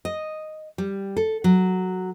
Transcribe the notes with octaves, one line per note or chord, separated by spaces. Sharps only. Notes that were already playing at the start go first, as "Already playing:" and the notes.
D#5
G3
A4
F#3